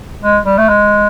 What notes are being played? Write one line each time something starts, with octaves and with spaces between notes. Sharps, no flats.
G#3
G3
A3
G#3